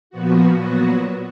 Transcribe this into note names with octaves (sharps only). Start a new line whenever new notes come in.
A#2 F3 B3 F#4
A#2 F#3 B3 F#4